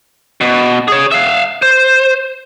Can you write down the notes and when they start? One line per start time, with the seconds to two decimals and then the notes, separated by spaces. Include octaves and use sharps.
0.41 B2
0.88 G#4 C#5
1.12 E5 F5
1.62 C5